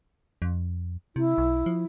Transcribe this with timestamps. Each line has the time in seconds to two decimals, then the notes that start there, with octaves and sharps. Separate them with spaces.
0.42 F2
1.16 C3 E4
1.38 B1
1.66 F3